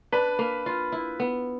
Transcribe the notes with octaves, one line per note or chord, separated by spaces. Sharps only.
D4 B4 B5
A#3
F4
E4
B3